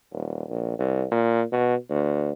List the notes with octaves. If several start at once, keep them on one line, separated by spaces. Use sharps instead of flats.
D#1
A#1
C2
A#2
B2
D2